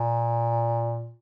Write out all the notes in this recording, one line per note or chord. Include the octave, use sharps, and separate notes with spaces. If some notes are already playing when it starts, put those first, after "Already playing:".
Already playing: A#2